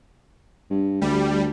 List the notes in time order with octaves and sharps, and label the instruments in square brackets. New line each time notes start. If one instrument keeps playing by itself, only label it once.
[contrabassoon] G2
[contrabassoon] D2 [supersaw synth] G3